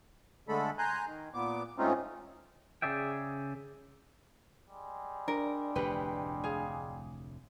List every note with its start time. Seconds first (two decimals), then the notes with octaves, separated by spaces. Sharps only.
0.48 D3 G#3 A3 A4 B5
0.78 G#5 A#5 C6 F#6 G6
1.06 D#3
1.34 A#2 B3 D6
1.78 G#2 A3 C4 C#4 D#4 F4
2.82 C#3 G#4 D5 E5 G5
4.68 G3 G#3
5.28 D4 A#4
5.75 F1 D2 A2 G4 B4
6.44 G#4 F5